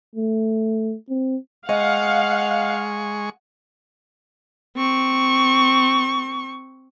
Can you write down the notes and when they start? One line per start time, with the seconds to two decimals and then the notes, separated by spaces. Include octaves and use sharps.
0.15 A3
1.09 C4
1.69 G#3 D#5 F5 F#5 C#6
4.76 C4 C#6